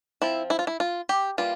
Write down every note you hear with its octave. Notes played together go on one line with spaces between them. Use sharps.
F3 C4 E4
E4
F4
E4
F4
G4
E3 G3 A#3 F4